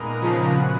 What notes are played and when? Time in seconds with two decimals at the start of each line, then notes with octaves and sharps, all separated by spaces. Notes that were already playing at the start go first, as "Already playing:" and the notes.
Already playing: A#2 G#3 B3 D#4 A#4
0.22 C#3 F3
0.54 A#2 G#3 B3 F#4